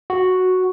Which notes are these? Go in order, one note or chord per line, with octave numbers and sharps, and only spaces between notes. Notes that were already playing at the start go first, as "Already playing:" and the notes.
F#4